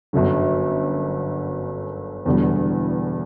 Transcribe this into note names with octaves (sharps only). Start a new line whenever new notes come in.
G1 F#2 D3 F#3
E1 E2 D3 G3